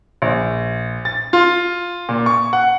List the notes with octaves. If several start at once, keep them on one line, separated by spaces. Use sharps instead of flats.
A#1
A6
F4
A#2
C#6
F#5